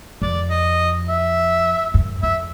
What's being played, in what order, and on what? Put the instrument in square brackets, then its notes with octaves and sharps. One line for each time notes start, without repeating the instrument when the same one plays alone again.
[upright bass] F2 [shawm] D5
[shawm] D#5
E5
[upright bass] F#2
[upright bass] F2 [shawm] E5